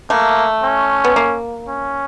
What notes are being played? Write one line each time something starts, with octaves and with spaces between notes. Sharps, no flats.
A3 A#3
C#4
B3
A#3
C#4